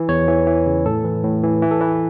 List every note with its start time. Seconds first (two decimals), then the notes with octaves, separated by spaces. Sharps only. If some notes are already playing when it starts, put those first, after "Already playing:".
Already playing: E3
0.09 E2 C#5
0.28 E3
0.46 E3
0.66 C#3
0.85 A2 A4
1.04 E3
1.24 A2
1.43 E3
1.62 E3
1.71 A4
1.81 E3 B4